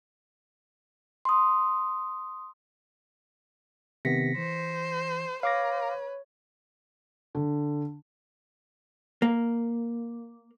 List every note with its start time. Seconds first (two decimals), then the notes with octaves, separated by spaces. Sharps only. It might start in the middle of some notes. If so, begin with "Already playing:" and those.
1.25 C6 D#6
4.05 C3 D#3 B3 A#6 B6 C#7
4.37 E3 C5
5.43 B4 C#5 F5 D6 A#6
7.35 D3
9.22 A#3